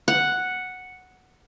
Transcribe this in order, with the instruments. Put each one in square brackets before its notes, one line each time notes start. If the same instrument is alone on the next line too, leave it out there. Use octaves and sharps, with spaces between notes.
[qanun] F#5